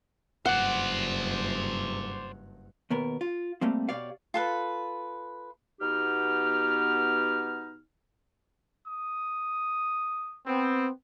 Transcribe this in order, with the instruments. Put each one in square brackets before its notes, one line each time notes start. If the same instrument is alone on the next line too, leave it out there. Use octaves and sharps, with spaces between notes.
[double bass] F#1 G2 [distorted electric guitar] C5 D5 [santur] F#5
[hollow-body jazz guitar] D#2 B2 B3 A#4
F4
G3 A3 A#3 C4
B2 G4 C#5 D5 F5
[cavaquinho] F4 A4 B4
[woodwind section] B2 B3 D#4 G4 F6
[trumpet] D#6
[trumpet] B3 [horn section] C4